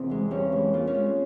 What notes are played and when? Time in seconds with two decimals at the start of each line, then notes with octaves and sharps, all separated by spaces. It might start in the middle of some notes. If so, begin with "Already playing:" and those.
Already playing: E2 C3 C4 E4
0.10 E3 G#3
0.31 G2 C#4
0.52 E3 G#3
0.73 A#2 F4
0.87 C#4
0.95 G#3